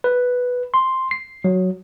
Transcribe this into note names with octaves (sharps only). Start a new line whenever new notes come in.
B4
C6
C7
F#3